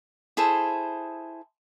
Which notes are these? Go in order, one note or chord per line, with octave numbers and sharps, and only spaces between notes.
E4 G#4 A4 C5